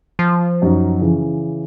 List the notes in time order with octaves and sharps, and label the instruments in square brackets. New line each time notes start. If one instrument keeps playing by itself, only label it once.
[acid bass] F3
[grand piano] F#2 D#4 F#4
C#3 E3